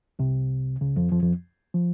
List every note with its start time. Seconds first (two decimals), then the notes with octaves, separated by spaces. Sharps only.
0.19 C2 C3
0.81 C#2 C#3
0.96 F2 F3
1.12 F2 F3
1.22 F2 F3
1.74 F3